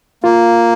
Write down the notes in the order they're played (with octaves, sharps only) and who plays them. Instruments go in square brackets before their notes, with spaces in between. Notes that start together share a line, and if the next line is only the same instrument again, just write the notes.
[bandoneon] A#3 [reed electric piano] F4